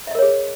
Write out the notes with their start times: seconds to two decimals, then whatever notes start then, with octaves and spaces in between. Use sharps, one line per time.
0.07 E5
0.11 D#5
0.15 A#4
0.19 C#5
0.22 G#4